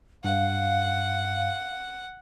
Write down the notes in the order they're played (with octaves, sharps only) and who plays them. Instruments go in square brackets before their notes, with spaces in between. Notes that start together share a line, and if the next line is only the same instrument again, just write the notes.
[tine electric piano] G2 [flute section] F5 [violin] F#5